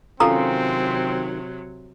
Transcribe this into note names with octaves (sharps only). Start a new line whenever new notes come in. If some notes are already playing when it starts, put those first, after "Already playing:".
C3 D#3 F#3 C4 C#4 F4 A4 A#5